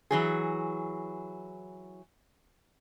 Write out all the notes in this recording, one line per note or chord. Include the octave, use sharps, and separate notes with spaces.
E3 F#3 G#4